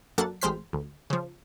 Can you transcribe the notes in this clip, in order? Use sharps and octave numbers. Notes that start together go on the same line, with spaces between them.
F#2 A#3 D4 A4 F#5 A6
A1 G#3 C4 C5 F6 B6
D2
C#3 F3